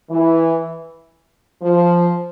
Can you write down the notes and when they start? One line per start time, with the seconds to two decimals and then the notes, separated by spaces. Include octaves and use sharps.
0.11 E3
1.62 F3